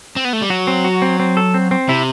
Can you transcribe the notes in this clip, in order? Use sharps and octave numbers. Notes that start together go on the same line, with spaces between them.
C4
B3
A3
G3
F#3 F#4
C4
F#4
C4
C4
A4
C4
C4
C3 E4